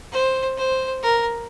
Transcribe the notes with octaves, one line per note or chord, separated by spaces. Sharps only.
C5
C5
A#4